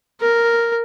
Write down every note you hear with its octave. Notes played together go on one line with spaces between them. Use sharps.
A#4